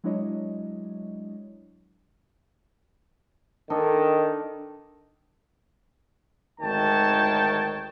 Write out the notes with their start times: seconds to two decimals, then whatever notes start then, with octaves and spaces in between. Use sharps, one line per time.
0.04 F#3 G#3 D4 E4 C#5 D#5
3.70 D#3 D4 A4 D#5
6.61 G#1 D2 D#3 C#5 G5 A5